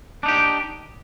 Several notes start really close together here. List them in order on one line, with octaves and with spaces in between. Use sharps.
D4 D#4 G4